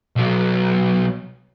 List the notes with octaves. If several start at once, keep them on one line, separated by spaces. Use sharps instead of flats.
B1 F#3